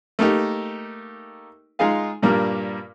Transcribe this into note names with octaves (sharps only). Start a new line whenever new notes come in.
A3 A#3 D#4 G4
G#3 D#4 F4 G#4 F5
G2 A#2 G3 A#3